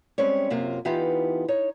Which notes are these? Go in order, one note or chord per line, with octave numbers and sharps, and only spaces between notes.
G3 G#3 C4 C#4 C#5
F#2 C3 A#3 F4
E3 B3 D#4 F4 G4
D#4 C#5